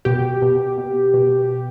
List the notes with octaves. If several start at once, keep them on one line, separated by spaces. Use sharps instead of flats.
B2 G4
B2
B2
B2